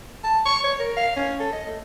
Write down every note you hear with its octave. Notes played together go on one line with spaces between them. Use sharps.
A5
C#6
C#5
A#4
F5
C#4
A4
D#5
A3